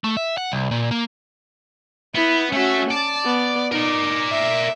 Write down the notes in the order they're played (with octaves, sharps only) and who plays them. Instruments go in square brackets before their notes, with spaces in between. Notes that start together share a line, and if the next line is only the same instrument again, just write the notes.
[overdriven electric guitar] A3
E5
F#5
C2
A#2
A#3
[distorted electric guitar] B3 [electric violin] E4
[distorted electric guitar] A3 E5 [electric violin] C#4 F#4
[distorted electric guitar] D5 [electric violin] A5
[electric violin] B3
[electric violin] D#4 [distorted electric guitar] A#4 D5
[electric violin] E5